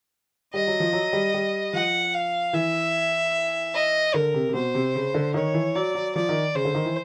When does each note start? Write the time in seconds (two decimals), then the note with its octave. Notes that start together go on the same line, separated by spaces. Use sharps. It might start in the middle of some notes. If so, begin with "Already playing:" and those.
0.53 G3 D#5
0.67 F#3
0.80 F3
0.93 F#3
1.13 G3
1.34 G3
1.73 F3 F#5
2.14 F5
2.53 E3 E5
3.74 D#5
4.14 D3 A#4
4.34 C3
4.49 C3
4.54 B2 C5
4.75 C3
4.95 C#3
5.14 D3
5.34 D#3 C#5
5.54 E3
5.75 F#3 D5
5.95 F#3
6.15 F3 D5
6.29 D#3
6.55 C#3 C5
6.65 D3
6.75 D#3
6.85 E3